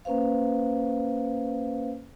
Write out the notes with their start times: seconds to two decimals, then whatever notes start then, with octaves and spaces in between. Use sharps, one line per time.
0.05 A#3 C#4 B4 C5 F5